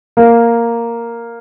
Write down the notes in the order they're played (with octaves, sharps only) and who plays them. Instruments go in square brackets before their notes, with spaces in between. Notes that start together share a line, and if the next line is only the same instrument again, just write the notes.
[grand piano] A#3